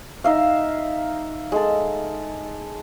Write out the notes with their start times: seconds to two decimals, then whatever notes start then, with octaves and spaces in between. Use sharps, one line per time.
0.24 D#4 E5 F5
1.52 G#3 A4